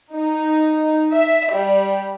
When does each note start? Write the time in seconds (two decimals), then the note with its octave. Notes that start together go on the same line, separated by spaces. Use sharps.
0.15 D#4
1.12 E5
1.52 G3